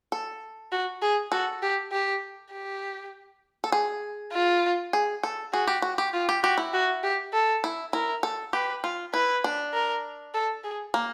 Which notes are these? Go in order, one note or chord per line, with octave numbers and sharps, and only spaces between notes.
A4
F#4
G#4
F#4 A4
G4
G4
G4
A4
G#4
F4
G#4
A4
F#4 G#4
G4
F#4
G4
F4
G4
F#4 G4
E4
F#4
G4
A4
E4
E4 A#4
A4
G4 B4
F4
E4 B4
D4
A#4
A4
G#4
A#3